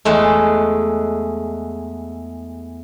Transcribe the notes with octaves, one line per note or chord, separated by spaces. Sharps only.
E2 G#3 A3